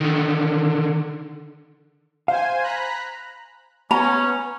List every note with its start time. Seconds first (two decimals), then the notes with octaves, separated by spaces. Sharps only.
0.01 D3 D#3
2.28 C5 F5 G#5
2.63 A#5 B5 F#6
3.91 B3 C#4 A#5